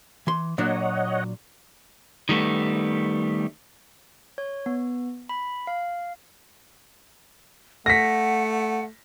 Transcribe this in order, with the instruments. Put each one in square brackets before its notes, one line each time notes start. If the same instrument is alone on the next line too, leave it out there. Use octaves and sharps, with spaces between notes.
[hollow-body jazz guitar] E3 C6
[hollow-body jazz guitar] A#2 F#3 D4 [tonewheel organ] C#5 D#5 F#5
[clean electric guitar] D#3 G3 A3 B3
[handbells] C#5
B3
B5
F5
[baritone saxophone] A3 [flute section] F#5 [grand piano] A#6 B6